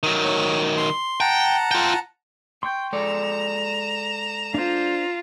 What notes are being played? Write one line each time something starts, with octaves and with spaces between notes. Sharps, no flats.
D#3 F#3
C#5
C6
F#5 G5 A5 A#5
F4 G5
G5 C6 C#6 G6
G#3 A4 D5 A#5 E7
D4 F4 C5